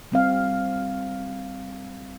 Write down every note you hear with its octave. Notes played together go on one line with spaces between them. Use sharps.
G3 C4 F5